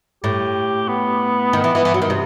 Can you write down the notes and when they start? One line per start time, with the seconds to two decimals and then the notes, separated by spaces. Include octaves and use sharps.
0.23 A2 G4
0.88 B3
1.53 D#3
1.64 E3
1.75 E3
1.85 E3
1.94 F#3
2.02 D#3
2.10 C3